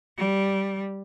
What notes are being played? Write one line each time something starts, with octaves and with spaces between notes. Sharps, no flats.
G3